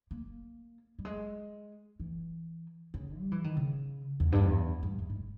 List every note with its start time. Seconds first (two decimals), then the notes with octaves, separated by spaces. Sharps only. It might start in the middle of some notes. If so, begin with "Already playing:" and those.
0.11 A#3
0.99 G3
1.05 G#3
2.00 E3
2.94 C#3
3.19 G3
3.32 E3
3.44 D#3
3.57 C#3
4.20 E2
4.32 G2
4.45 E2
4.83 G2
4.99 E2
5.10 G#2